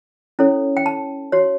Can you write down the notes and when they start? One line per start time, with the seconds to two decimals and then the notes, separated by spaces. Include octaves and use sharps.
0.39 C#4 E4 A4 C#5
0.77 G5
0.86 A5
1.32 F#4 C#5